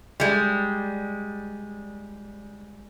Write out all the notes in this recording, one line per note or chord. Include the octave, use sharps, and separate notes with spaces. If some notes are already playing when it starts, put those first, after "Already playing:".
G3 G#3